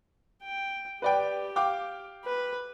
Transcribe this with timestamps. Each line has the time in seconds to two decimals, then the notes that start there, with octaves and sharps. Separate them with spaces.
0.44 G5
1.02 G4 B4 D5 G5
1.56 F5 G5 D6
2.25 B4